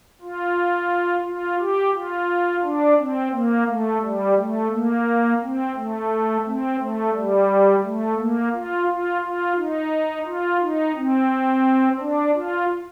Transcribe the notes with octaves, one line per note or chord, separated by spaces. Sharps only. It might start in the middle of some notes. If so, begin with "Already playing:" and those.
F4
F4
G4
F4
D4
C4
A#3
A3
G3
A3
A#3
C4
A3
C4
A3
G3
A3
A#3
F4
F4
F4
D#4
F4
D#4
C4
D4
F4